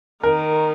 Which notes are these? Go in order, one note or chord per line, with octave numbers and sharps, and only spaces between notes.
D#3 A#4